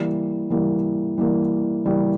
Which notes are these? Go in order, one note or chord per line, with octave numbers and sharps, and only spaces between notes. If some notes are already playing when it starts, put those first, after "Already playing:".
Already playing: E3 G3 A#3
E3 G3 A#3
E3 G3 A#3
E3 G3 A#3